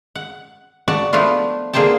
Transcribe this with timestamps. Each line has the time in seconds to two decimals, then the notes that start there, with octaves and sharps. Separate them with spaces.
0.15 F#5
0.88 F#4 D5 F#5 A5
1.13 F3 A3 B3 D4 F4
1.73 D3 A#3 G#4 C5 G5 A5